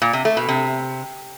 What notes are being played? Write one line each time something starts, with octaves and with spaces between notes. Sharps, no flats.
A#2
C3
A3
B2
C3